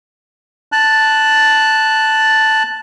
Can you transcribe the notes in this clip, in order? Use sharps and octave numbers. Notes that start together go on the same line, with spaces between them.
A5 F#6